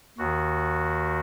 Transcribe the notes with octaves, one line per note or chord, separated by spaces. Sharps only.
D#2 D#3 F#4